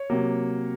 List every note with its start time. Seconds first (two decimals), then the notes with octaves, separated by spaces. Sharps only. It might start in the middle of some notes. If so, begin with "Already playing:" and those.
Already playing: C#5
0.10 C3 F#3 A#3